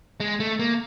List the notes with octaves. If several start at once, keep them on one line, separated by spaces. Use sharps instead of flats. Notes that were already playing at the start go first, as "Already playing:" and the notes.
G#3
A3
A#3